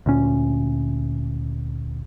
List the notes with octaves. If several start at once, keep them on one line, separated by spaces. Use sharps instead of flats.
D2 A#2 C#4